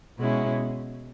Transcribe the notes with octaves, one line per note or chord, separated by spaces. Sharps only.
B2 G#3 C#4 E4